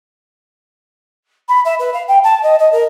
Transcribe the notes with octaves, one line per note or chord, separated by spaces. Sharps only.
B5
E5
B4
F5
G5
A5
D#5
D#5
A#4